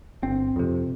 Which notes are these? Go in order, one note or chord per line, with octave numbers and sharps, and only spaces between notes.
G1 C4
F2 C3